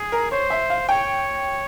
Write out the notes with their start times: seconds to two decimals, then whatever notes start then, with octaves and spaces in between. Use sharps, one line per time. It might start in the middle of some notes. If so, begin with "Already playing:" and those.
Already playing: G#4
0.12 A#4
0.31 C5 C#5
0.50 E5
0.70 F5
0.89 C#5 G5